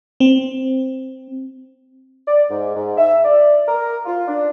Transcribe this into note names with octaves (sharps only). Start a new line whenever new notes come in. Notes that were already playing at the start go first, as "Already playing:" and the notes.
C4
D5
G#2
G#2
E5
D5
A#4
F4
D4